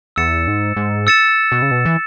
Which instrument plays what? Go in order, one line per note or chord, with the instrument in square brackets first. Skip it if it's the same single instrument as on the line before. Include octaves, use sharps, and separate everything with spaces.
[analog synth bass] E2 [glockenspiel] E6 A6 C#7 E7
[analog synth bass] G#2
G#2
[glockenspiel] E6 A6 C#7 E7
[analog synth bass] B2
C#3
B2
E3